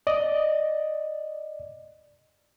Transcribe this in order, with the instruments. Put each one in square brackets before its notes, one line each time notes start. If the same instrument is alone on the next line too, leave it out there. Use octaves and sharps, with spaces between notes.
[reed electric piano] D5 D#5